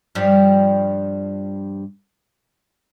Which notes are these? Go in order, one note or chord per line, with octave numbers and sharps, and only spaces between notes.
G2 F3 G3